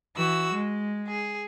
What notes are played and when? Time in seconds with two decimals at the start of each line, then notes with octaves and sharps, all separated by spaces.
0.16 E3 F#4 E6
0.54 G#3
1.07 G#4